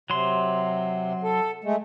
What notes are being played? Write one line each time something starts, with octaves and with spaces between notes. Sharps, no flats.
C3 F#3 C6
A4
G#3 A3